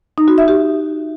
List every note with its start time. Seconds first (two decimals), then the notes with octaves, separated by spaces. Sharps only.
0.18 D#4
0.28 F#4
0.38 E5
0.48 G4